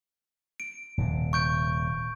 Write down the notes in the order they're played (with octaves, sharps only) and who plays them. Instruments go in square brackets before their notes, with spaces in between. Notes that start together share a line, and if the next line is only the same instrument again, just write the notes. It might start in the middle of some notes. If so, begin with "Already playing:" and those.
[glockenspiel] D7
[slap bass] D#1 C3
[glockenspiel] C#6 G6 D7